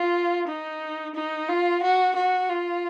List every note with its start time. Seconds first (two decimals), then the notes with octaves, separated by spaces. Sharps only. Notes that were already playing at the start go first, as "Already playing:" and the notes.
Already playing: F4
0.47 D#4
1.15 D#4
1.48 F4
1.83 F#4
2.16 F#4
2.49 F4